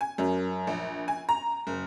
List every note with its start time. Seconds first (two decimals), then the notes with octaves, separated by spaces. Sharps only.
0.01 G#5
0.18 F#2
0.67 A#1
1.08 G#5
1.29 A#5
1.67 F#1